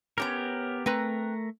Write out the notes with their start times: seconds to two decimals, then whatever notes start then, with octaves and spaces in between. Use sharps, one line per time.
0.18 B3 C#4 G4 A#4 C#5 A#5
0.86 A3 C4 A#4 B4 A#5